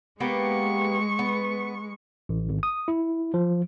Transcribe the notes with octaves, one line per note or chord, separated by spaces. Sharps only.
G#3 A#3 B3 G4 C#6
B3
A1
G#1
D#6
E4
F3